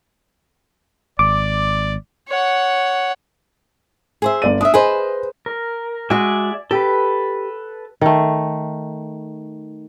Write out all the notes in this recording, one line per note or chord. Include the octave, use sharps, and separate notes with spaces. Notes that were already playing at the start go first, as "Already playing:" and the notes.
G#1 D5 D6
C#5 F#5
G#4 C5 E5
G1 D5 D#7
D4 E5 D#6
G#4 B4 C5 D#5
A#4
G#3 F#4 D5 E5 G#5
G4 A4 B4
D#3 A3